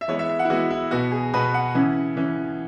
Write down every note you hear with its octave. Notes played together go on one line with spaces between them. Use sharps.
E5
E3 G#3 B3 C#5
E5
E5
F#5
E4
E3 G#3 B3 F#4
E4
B2 B3 F#4
G#4
B2 B3 B4
F#5
C#3 E3 C#4
C#3 E3 C#4